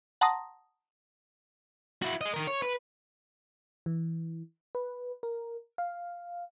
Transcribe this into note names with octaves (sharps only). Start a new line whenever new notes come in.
F#5 A5 A#5 C6 D#6 A#6
E4 F#4
G#4 D#5
D#3 A#4
C#5
B4
E3
B4
A#4
F5